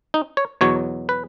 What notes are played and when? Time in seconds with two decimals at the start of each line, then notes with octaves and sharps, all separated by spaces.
0.14 D#4
0.37 C#5
0.61 E2 B2 F#3 C#5
1.09 B4